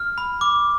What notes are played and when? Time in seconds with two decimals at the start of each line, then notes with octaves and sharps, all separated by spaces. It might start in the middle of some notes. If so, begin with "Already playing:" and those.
Already playing: F6
0.18 B5
0.41 D6